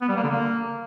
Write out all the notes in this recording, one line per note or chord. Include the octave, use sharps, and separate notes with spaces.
B3
G3
A#3
D3
A#3